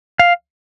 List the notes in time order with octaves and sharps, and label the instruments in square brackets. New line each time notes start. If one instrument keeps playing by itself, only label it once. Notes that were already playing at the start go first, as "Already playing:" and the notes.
[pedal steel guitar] F5